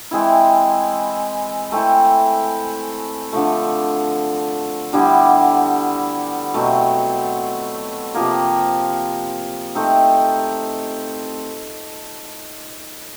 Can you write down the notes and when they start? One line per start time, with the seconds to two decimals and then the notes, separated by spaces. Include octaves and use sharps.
0.11 E3 G#3 C4 E4
1.72 A3 C4 E4
3.33 D3 F3 A3
4.93 D3 G3 B3 E4
6.54 B2 F#3 A3 C4
8.15 C3 F3 A#3
9.75 A3 C4 D#4